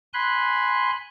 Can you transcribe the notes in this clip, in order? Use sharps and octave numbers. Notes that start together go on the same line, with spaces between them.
G#5 B5 C6 F#6